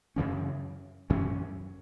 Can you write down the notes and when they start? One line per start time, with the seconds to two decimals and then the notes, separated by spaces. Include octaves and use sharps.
0.16 F#2 C#3 E3 C#4
1.10 F#2 E3 C#4